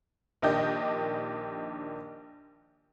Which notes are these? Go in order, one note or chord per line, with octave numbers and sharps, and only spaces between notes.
A#1 D#3 D4 G4 D#5 G6